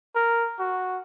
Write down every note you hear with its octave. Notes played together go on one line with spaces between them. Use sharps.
A#4
F#4